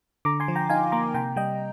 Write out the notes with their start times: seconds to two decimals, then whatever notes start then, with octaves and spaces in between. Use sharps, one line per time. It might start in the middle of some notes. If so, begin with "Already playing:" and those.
0.25 D3 A#5 D6
0.40 G#5 C6
0.48 F3
0.56 G5 A#5
0.69 D#4 F5 G#5
0.92 A#3 A#5 D6
1.14 C3 G5 A#5
1.36 G3 D#5 G5